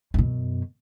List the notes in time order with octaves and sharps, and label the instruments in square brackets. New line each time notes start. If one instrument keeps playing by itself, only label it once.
[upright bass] F#2 B2